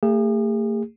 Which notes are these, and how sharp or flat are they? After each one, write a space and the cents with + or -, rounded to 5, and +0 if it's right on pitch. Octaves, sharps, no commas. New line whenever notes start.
A3 +40 G#4 -40